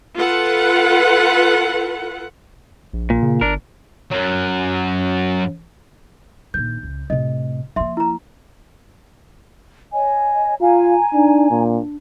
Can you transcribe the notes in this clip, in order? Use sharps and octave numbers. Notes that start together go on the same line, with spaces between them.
F4 A4 B4 F#5
A#1
A#2
C#3
G1 D4 A#4
F#2 F#3
A#1 D#3 G6
C#2
A2 C3 D#5
F3 A#3 E5 C6
E4 A#5
C#5 D#5 G#5
F4 F5 G#5 A#5
D4 D#4
A#2 D4